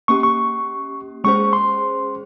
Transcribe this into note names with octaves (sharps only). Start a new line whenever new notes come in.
A#3 C#4 G4 C#6
C#6
G#3 C#4 G#4 C5 C#6
C6